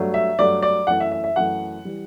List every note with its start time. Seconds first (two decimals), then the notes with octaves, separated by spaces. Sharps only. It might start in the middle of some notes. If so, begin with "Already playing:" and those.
Already playing: G2 F#3 A3
0.14 E5
0.39 G2 F#3 A3 D5
0.62 D5
0.87 F#2 E3 A3 F#5
1.00 E5
1.12 E5
1.24 E5
1.36 F#2 E3 A3 F#5
1.85 E3 G3